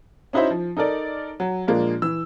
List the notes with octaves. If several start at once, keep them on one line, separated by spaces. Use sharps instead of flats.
C#4 D#4 E4 F#4 C5 E5
F3
D#4 A4 A#4 D5
F#3
A#2 F3 G#3 A#3 D4
E3 E6